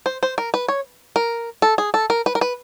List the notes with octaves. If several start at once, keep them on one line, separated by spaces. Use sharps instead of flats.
C5
C5
A#4
B4
C#5
A#4
A4
G#4
A4
A#4
B4
A#4
B4